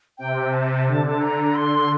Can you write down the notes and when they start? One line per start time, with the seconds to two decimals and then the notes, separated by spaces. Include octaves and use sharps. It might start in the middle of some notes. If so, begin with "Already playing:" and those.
0.18 C3 G5
0.53 A5
0.87 D3
1.21 A#5
1.55 C6